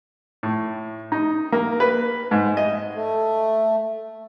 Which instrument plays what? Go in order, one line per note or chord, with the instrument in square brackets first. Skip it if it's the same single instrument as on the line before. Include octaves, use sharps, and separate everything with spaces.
[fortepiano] A2
D#4
A#3
B4
G#2
D#5
[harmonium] A3